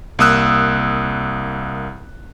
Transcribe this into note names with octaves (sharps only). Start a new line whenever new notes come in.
C2 A#3 D#6 E6 F#6